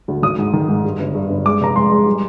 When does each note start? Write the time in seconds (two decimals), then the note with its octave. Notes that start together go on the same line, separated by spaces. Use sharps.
0.08 D2
0.22 G#1 D#6
0.38 G#2
0.53 D#3
0.69 G#2
0.85 G2
1.00 G1
1.15 G2
1.30 G1
1.45 G#3 D6
1.61 F1 A#5
1.76 G#3 C6
1.91 G#3
2.06 G3